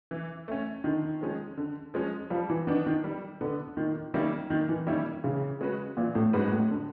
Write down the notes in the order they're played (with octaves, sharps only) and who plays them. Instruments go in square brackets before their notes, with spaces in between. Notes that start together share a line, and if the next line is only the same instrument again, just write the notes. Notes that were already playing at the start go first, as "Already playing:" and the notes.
[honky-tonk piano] E3
A3 C#4
[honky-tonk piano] D3 [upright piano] D#3
[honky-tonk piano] F3 G#3 C#4
D3
F3 G#3 C#4
[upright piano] F3 [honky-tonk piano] G3
[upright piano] E3
[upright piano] D#3 [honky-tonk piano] B3 D4
[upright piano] D#3
[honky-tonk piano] G3
[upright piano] D3 [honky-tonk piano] B3 D4
[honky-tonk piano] A#2 [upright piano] D#3
[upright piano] D#3 [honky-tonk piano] G3 A#3 C#4 E4
[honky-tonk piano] A#2 [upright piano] D#3
[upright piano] E3
[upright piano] D#3 [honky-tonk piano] G3 A#3 C#4 E4
[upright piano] C#3 [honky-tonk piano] E3
[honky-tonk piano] G#3 C#4 F#4 B4
[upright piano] A#2 [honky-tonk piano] E3
[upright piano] A2
[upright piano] G#2 [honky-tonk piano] G#3 C#4 F#4 B4
[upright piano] A2
[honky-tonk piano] D3